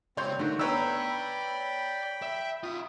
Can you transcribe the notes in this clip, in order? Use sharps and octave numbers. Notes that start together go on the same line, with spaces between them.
C#2 C4 C#5 D5 C6 G6
D3 D#3 A3 F#4
B4 C#5 D5 G5 A#5 B5 E6
E5
F4 E5 D#6